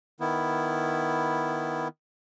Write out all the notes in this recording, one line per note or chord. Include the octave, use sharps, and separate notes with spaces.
D#3 B3 E4